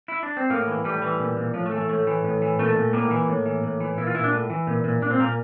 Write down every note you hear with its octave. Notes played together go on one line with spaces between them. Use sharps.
E4
D4
C4
A2 A#3
E3
A2 G3
E3
A#2
A#2
A2 F3
A3
E3
A3
A2 A3
E3
A2
E3
A#2 A3
A#2
A2 A#3
E3
A2
E3
A2
E3
A#2 E4
F4
A#2 E4
D4
A2
E3
A#2
A#2
A#2 D4
C4
A#2 A#3